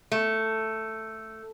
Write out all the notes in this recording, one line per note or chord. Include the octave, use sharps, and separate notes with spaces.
A3